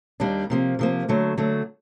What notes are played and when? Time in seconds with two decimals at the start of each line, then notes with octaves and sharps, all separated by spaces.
0.20 D#2 D#3 G3 A#3 D4
0.50 C3 F3 A#3
0.79 C3 F3 A#3
1.09 D3 F#3 A3
1.37 D3 F#3 A3